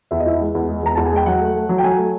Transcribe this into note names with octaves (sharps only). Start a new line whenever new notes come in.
E2 E5
D#5
E3 E5
G#3
E2
G#3
E2 A#5
E2 A5
G#5
G#3 G5
F#3 F#5
A3
A3
F#3
G5
F#3 G#5
A3